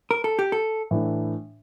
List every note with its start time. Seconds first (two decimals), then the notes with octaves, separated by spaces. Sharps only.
0.11 A#4
0.24 A4
0.39 G4
0.52 A4
0.91 A2 E3 A3 D4